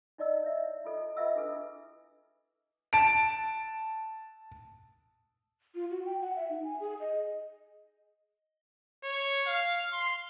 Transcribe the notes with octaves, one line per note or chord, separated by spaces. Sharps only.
D#4 E4 D5 D#5 E6
C#5 E5
E4 F4 A4 D#5
F4 B4 D#5 E5 F#5 E6
D4 E4 G#4 A4 B4
A5 D7
F4
F#4
G5
F#5
E5
D#4
G#5
G#4
D#5
C#5
F5
C6